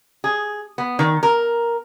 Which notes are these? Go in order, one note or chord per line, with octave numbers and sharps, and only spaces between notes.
G#4
B3
D#3
A#4